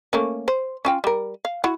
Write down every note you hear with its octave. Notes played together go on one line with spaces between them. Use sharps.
A3 A#3 C#4
C5
C#4 F4 G5
G3 A#4
F5
E4 F#4 F#5